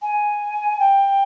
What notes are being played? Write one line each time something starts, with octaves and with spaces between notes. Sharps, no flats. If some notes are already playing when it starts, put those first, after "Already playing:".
G#5
G5